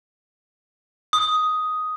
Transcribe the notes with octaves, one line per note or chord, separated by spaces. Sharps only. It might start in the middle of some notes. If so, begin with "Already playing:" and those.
D#6